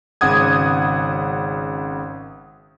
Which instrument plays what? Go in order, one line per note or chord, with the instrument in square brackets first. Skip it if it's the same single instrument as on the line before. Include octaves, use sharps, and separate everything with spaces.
[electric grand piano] G#1 C#3 F#5 D#6 G#6